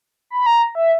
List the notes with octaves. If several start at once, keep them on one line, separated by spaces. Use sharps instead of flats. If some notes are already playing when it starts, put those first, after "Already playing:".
B5
A#5
E5